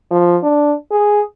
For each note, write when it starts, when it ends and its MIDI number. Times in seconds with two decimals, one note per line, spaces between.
0.11 0.37 53
0.43 0.74 62
0.91 1.21 68